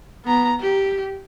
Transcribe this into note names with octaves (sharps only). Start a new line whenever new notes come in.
B3 A#5
G4